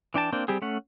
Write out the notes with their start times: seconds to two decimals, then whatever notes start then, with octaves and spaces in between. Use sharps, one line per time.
0.14 E3 D4 G5 A5
0.32 A#3 C4 D4 G5
0.48 G3 C4 G4 G#4
0.62 A3 C#4 F#5